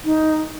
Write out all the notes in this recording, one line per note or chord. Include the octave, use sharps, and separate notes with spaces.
D#4